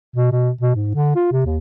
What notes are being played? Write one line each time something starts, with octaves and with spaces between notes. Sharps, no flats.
B2
B2
B2
G#2
D3
F4
C3
D#2